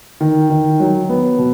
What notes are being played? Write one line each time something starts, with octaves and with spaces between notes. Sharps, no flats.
D#3
D#3
F#3
B3
B2